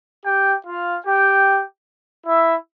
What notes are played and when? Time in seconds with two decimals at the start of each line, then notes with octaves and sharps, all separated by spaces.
0.25 G4 G5
0.66 F4 F5
1.06 G4 G5
2.27 E4 E5